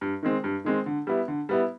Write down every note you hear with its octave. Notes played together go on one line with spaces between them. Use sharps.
G2
D#3 G#3 C4
G2
D#3 G#3 C4
D3
G3 B3 E4
D3
G3 B3 E4